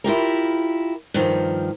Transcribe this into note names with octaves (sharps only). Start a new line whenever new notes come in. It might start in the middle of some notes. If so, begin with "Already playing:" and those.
E4 F4 G4 A#4
G2 D#3 F3